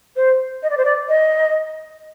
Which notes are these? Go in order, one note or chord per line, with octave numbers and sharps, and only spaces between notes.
C5
D#5
D5
C5
D5
D#5